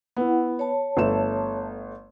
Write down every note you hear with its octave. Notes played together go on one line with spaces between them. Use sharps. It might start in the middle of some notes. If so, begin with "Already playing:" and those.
B3 E4 F#5
C#5 A5
G1 A3 E7